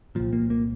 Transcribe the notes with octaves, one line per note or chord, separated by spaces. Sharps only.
C2 A#2 F3
A#3
A#3